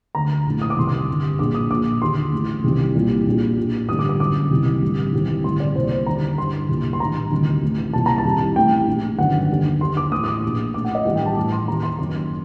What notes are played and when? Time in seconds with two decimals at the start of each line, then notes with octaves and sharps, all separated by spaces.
0.15 D2 D3 A#5
0.46 A#1 A2
0.62 D#6
0.70 D6
0.77 C2 C3 D#3 C6
0.87 D6
1.08 G1 G2 D3
1.39 A#1 A#2 D6
1.55 D#6
1.70 A#1 A#2 D6
2.02 D#2 D3 C6
2.33 A1 A2
2.64 C2 C3 D#3
2.95 C2 A#2
3.26 A#1 A#2
3.57 A#1 A#2
3.89 A1 G2 D3 D#6
3.99 D6
4.09 D6
4.19 F#1 F#2 D3 D6
4.51 C2 C3 D#3
4.82 A1 G2 D3
5.13 C2 C3 D#3
5.44 A1 C6
5.47 G2 D3
5.60 D5
5.75 C2 A#2 C5
5.91 C5
6.06 D#2 D3 A#5
6.38 G1 G2 D3 C6
6.69 C2 A#2
6.93 C6
7.00 A1 G2 D#3 A#5
7.31 D2 C3 D#3
7.62 A1 A2
7.93 C2 A#2 A5
8.06 A#5
8.18 A5
8.25 C2 C3 D#3
8.56 A1 A2 G5
8.87 A#1 A2
9.18 G1 F#2 D#3 F#5
9.50 D#2 D3
9.80 D#2 D3 C6
9.97 D6
10.12 A2 D#6
10.16 A1
10.24 D#6
10.28 D6
10.43 A#1 A#2
10.74 A#1 D6
10.78 A2
10.85 F#5
10.95 D#5
11.05 A1 G2 D#3 F#5
11.16 G5
11.26 A5
11.36 A1 A2 D6
11.52 C6
11.68 D#2 D#3 A#5
11.83 C6
11.99 F#1 F#2 D#3 C6